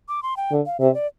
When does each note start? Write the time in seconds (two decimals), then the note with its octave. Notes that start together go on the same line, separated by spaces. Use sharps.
0.09 D6
0.23 C6
0.37 G5
0.52 D3
0.66 F5
0.80 C3 E5
0.94 D5